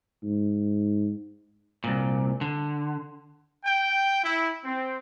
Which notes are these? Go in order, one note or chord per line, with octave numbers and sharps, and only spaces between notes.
G#2
C2 A#2
D3
G5
E4
C4